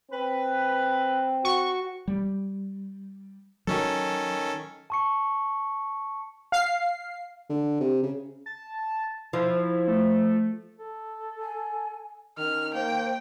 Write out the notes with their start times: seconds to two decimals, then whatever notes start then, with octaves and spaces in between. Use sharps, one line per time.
0.12 C4 B4
1.45 F#4 C#6
2.08 G3
3.67 D#3 F#3 C#4 A4
4.90 A5 C#6 C#7
6.52 F5 C7
7.49 D3
7.80 C3
8.03 C#3
8.46 A5
9.33 F3 E4
9.88 A3
10.79 A4
11.41 G#5
12.38 D#3 C#4 F6
12.74 A#3 C5 G5